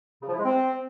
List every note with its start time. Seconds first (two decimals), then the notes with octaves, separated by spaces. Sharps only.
0.22 C#3
0.27 F3
0.33 E4
0.38 G#3
0.44 C4